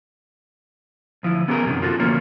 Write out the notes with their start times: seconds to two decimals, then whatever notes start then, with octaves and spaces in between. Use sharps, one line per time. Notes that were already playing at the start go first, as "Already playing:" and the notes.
1.23 D2 F3 E4
1.48 B3 C#4 G4 G#4 A#4
1.66 F#2 C3 D#3
1.82 F4 F#4 A4
2.00 D2 F3 A#3 C#4